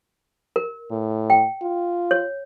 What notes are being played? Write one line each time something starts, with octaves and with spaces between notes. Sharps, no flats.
A#4
A2
G5
F4
C#5